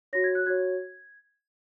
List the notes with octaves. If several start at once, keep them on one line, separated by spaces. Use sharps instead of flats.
F#4 C#5 A#6
G#6
F#6
F#4 C#5 G#6